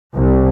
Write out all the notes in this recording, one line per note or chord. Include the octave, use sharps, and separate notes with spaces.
C2